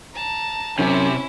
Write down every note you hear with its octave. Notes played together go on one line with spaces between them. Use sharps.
A5 A#5
F#2 C3 C#4 E4